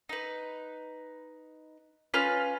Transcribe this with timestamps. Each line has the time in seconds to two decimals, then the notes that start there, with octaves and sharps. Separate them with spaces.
0.09 D#4 B4
2.14 C#4 F4 B4 F6